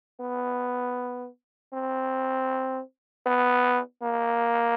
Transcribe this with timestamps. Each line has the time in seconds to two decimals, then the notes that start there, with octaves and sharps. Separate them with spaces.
0.20 B3
1.74 C4
3.26 B3
4.03 A#3